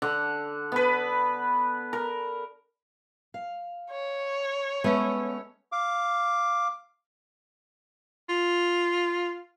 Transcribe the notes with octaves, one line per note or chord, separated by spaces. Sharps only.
D3 F#5
B3 B4
A#4
F5
C#5
G#3 A3 B3 C#4
F5 D6
F4